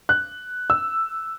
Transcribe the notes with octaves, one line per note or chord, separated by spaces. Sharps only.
F#6
E6